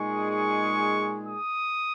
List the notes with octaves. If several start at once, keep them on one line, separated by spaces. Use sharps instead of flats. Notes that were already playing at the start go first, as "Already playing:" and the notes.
Already playing: A#2 G#3 D#4 G#4 C#6
C#6
D#6